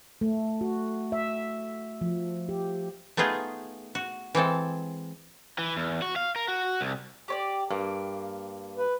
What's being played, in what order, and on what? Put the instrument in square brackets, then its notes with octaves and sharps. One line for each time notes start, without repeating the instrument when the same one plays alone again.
[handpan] A3
F#4
E5
F3
G4
[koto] A3 B3 D#4 F4 G#4
F#4
E3 G#3 C4 A4
[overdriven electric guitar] E3
E2
F#4
F5
A#4
F#4
C2
[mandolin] G4 C#5 D5
[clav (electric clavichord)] G2 [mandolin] A#3
[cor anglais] B4